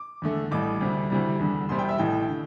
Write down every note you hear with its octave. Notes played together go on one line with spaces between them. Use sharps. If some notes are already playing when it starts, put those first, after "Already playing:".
Already playing: D6
E2 D3 A3
A1 A2 G3 D6
D2 C3 G3
D2 C3 E3 G3
E2 D3 G3
E1 E2 C3 G3 C6
G5
E5
A1 A2 E3 G5
D3